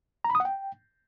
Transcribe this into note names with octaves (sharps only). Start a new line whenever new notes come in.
A#5
B5
D#6
F#5
G5